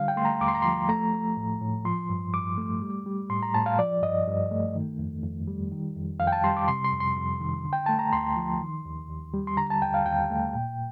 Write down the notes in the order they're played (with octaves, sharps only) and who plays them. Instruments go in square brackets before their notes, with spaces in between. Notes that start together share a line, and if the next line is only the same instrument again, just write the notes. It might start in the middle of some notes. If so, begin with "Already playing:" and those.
Already playing: [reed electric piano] D3 G3 F5
G5
A3 C6
A#5
D#2 D6
C6
A#5
F3 C6
A3 A#5
A3
A2
A2
F3 C6
G2
G2 D6
A3
G3
G3
A2 C6
A#5
A2 A5
F5
F3 D5
G2 D#5
G2
A3
D#3
F2
F2
G3
D#3
F2
F2 F5
G5
A5
G3 C6
D6
C3 C6
C6
F2
C6
F2
D#3
D3
G5
A3 A5
A#5
D2 C6
F3
D#3
D#2
D#2
G3
C6
D3 A#5
A5
D#2 G5
F5
D#2 G5
A3
A#2